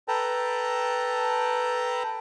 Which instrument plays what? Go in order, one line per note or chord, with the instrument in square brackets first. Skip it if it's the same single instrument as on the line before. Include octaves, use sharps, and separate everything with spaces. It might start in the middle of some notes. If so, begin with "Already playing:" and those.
[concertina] A4 B4 G5 A5 A#5